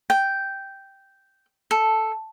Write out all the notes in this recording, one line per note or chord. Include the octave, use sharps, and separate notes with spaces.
G5
A4